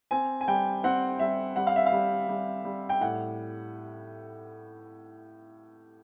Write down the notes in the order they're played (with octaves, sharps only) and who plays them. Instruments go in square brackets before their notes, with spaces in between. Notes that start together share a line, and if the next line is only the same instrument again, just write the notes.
[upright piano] C4 G#5
G#5
G3 G5
C4 F#5
G3 E5
G3 F#5
F5
E5
F5
G3
G3
G3
G5
A2 F#5